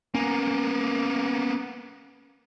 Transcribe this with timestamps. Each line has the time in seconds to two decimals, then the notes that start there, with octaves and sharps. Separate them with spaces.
0.15 A#3 B3 C#4 G#5 A#5